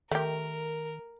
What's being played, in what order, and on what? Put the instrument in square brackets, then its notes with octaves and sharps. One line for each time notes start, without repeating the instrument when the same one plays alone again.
[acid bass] D#3 [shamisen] A3 G4 [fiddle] A#4